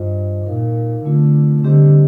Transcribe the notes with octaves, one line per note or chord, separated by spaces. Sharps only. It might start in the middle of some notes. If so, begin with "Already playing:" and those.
Already playing: G2 F4 C5 D#5
A#2 D#4 A#4 F5
D3 A3 C4 F4
D3 G3 C4 G4 C5 D#5